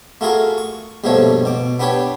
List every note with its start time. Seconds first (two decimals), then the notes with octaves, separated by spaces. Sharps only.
0.21 A3 F4 F#4 G#4 A#4
0.58 C#6
1.04 A#1 G2 B2 F3 A3 C#5
1.45 B2 D6
1.79 B3 D4 G4 B4 C#5